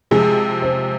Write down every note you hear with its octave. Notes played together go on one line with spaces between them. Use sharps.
C3 F3 G#3 G#4
C5